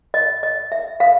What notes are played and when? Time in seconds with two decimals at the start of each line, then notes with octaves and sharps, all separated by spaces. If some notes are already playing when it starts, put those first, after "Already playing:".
0.14 D#5
0.43 D#5
0.72 E5
1.00 F5